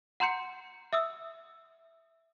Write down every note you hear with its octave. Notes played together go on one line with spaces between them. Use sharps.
F#5 A#5 C6 G6 C#7
E5 D#6 E6